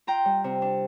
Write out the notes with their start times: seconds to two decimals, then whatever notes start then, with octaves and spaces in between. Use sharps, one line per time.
0.07 F4 G5 A#5
0.25 G3
0.44 C3
0.62 D4